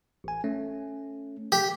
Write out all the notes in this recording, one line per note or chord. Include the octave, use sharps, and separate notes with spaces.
A1 G#5
A3 C#4
A3 G4 B6